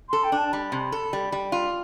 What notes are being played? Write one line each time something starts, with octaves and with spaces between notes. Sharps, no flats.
A4 C6
G5
D4
A5
G3 B5
C3
A4
G3
G3
F4